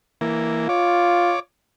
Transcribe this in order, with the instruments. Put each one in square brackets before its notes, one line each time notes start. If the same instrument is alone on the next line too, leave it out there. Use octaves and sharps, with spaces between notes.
[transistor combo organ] E3 A#3
[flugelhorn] F4 [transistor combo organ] C#5 D6